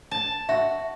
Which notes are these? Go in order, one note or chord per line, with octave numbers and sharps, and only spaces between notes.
A5
F#4 E5